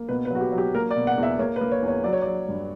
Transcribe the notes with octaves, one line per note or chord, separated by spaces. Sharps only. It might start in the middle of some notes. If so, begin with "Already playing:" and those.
Already playing: A#3
B2 B4
B4
F#3 F#4
G4
F#3
G4
A#3 A#4
D5
B2
F#5
E2
E5
A#3 C#5
B4
A#3
C#5
E2
C#5
F#3 D5
C#5
F#3 D5
G2